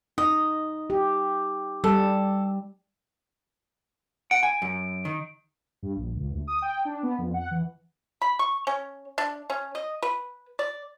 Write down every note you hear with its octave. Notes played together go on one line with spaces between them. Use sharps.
D#4 D#5
G4
G3 A4
F#5 D7
G#5
F#2
D#3
G2
A#1
C#2
D2
D#6
G5
D4
B3
F2
F#5
E3
B5
C#6
C#4
D4
C#4
D#5
B4
D5